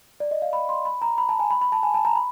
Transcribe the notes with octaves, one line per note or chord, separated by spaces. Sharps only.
D5
D#5
F5
B5
C6
B5
A#5
B5
A5
G#5
B5
B5
A5
G#5
A5
A#5
B5